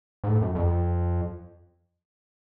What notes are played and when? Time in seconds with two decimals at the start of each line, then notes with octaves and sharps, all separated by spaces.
0.24 G#2
0.28 A2
0.41 F#2
0.55 F2